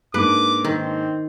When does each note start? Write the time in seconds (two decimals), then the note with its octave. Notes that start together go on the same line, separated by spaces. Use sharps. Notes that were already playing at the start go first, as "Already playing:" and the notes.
0.14 G#2 A#3 D4 B4 D6
0.64 D#3 C4